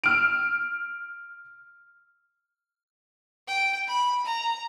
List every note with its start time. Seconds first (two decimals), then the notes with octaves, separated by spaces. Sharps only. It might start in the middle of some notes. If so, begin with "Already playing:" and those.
0.04 E6 F6 D7
3.48 G5
3.88 B5
4.25 A#5